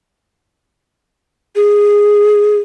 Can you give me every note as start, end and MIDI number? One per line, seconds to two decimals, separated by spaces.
1.56 2.57 68